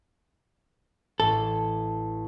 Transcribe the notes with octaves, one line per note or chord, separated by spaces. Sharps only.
A1 A2 A4